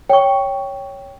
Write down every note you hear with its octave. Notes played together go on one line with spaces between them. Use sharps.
C#5 G5 C#6